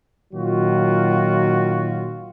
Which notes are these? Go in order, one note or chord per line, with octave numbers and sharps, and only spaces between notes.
A#2 D#3 F#3 F4 F#4